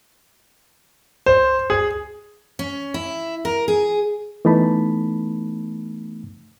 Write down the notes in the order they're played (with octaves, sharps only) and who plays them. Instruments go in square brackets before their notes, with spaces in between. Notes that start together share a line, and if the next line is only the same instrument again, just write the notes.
[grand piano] C5
G#4
[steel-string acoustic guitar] C#4
E4
A#4
G#4
[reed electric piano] E3 A3 B3 D#4 A5 B5